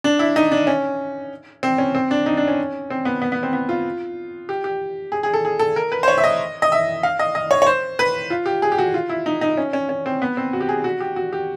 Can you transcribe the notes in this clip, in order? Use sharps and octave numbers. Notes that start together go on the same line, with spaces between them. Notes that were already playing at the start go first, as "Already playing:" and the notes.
D4
E4
D#4
D4
C#4
C4
C#4
C4
D4
D#4
D4
C#4
C4
B3
B3
B3
C4
B3
F4
G4
G4
G#4
G#4
A4
G#4
A4
A#4
B4
C5
C#5
E5
D#5
D#5
E5
F5
D#5
D#5
C#5
C#5
C5
B4
F4
G4
G#4
G4
F#4
F4
E4
D#4
D#4
C#4
C#4
C#4
C4
B3
C4
F#4
G4
G#4
F#4
G4
F#4
G4